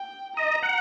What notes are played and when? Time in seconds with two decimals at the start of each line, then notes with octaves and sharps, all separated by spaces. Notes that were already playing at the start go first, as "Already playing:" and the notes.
Already playing: G5
0.37 D#5 A#5
0.63 F#5